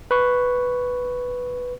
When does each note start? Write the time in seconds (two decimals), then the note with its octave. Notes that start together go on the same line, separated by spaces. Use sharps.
0.11 B4 C#6